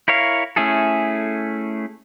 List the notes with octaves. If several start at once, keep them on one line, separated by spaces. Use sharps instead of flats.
E4 A#4 C#5 F5
A3 C#4 E4 G#4 A4